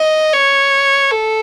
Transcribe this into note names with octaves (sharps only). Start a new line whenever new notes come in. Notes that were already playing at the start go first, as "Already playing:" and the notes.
Already playing: D#5
C#5
A4